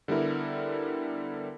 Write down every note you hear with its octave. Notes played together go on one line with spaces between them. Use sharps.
D3 G3 B3 E4 A#4